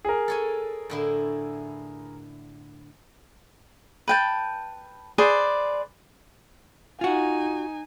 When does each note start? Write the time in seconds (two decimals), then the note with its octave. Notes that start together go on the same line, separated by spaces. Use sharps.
0.05 G#4 A#4
0.28 A4 C#5 G#5
0.90 A2 D3 E4
4.08 B4 G5 A5
5.18 G#4 B4 C5 D5
7.01 D#4 F4 F#4 G#5